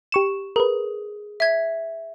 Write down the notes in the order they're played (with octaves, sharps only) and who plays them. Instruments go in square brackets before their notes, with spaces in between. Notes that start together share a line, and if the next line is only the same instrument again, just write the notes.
[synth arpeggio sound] G4 C#6 E7
[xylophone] G#4 [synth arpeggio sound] A#4 B4
[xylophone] E5 G#6